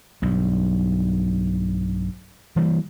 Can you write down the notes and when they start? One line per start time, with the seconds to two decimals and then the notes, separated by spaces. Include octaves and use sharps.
0.22 B1 G2
2.56 E3 G3 A#3